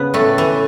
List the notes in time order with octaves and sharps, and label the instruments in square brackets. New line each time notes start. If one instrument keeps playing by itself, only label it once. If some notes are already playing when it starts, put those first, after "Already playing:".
Already playing: [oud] C#3 [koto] B3
[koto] A2 A3
E3